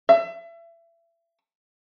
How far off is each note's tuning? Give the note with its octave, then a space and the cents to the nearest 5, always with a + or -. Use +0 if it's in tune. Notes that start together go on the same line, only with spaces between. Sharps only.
E5 +30